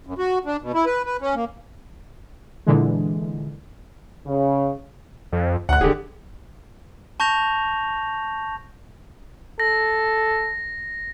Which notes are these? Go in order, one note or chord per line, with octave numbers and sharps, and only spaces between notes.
F#2
F#4
D4
B2
E4
B4
B4
C#4
A#3
A#2 D3 E3 G#3
C#3
F2
D2 F#5 F#6
D1 D3 G4 G#4
A5 C#6 G6 A#6 F7
A4 A#6